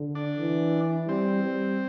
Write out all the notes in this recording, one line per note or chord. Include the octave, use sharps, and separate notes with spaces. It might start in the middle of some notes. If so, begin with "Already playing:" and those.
Already playing: D3
D4
E3
G3 C4
G3